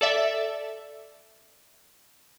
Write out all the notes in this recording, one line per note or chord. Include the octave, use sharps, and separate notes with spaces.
A4 D5 E5